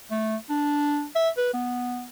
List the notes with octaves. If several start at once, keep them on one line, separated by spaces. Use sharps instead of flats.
A3
D4
E5
B4
B3